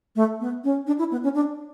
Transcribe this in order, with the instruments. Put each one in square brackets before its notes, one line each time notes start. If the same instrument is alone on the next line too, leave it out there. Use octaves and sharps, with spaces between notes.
[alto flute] A3
B3
C#4
D4
E4
B3
C#4
D4